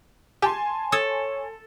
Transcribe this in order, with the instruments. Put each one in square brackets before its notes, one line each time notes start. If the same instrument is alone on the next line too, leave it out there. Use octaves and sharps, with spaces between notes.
[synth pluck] G4 [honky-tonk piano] G#5 A5 C6
[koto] A4 [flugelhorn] C#5 [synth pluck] D#6 E6 G#6